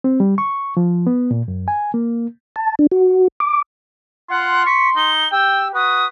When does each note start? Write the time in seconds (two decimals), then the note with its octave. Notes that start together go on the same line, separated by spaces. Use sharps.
0.04 C4
0.20 G3
0.38 C#6
0.77 F3
1.07 B3
1.31 A#2
1.48 F#2
1.68 G#5
1.94 A#3
2.56 A5
2.79 D4
2.92 F#4
3.40 D6
4.30 F4 F#5 C6
4.66 C#6 B6
4.96 D#4 G7
5.32 G4 G5 E6
5.74 F#4 B4 D#6